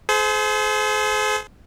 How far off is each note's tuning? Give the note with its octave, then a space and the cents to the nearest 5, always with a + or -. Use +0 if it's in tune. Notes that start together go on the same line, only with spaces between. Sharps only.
G#4 +40 C5 -20